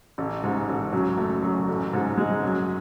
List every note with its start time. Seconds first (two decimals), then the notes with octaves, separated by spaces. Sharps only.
0.18 A1
0.44 G#2
0.69 A1
0.93 F#2
1.18 A3
1.43 F#2
1.68 A1
1.93 G#2
2.17 G#3
2.43 F#2